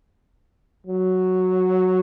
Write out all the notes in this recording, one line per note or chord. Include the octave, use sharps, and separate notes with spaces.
F#3